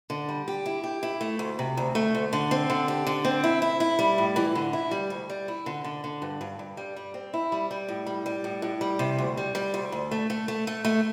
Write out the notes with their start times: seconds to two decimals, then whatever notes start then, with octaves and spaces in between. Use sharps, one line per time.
0.10 D3
0.29 G3
0.48 G4
0.66 E4
0.84 G4
1.03 E4
1.21 A3
1.39 D2
1.59 C3
1.77 D2
1.95 A3
2.15 D2
2.33 D3
2.51 C4
2.70 D3
2.88 G4
3.07 D3
3.25 C4
3.44 E4
3.62 E4
3.80 E4
3.99 G3
4.18 A2
4.36 E3
4.55 D3
4.73 E4
4.91 G3
5.10 D2
5.30 G3
5.48 E4
5.66 D3
5.84 D3
6.04 D3
6.22 G2
6.41 G2
6.59 G2
6.77 G3
6.96 G3
7.14 C4
7.34 E4
7.52 G3
7.71 G3
7.88 A2
8.06 G3
8.26 G3
8.44 A2
8.62 A2
8.81 G3
8.99 C3
9.18 D2
9.37 G3
9.55 G3
9.74 D2
9.92 D2
10.11 A3
10.30 A3
10.48 A3
10.67 A3
10.85 A3